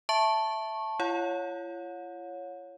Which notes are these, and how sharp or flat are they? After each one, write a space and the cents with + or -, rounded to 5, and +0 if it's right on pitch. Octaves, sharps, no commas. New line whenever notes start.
E5 +0 A5 +0 C#6 -20
F4 -45 C#5 +0 F#5 -40